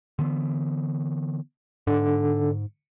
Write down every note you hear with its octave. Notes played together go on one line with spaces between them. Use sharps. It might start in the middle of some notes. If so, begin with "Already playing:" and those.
D3 E3 B3
G#2 D3